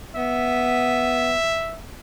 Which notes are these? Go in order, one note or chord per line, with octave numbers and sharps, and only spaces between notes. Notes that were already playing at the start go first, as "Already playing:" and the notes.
B3 E5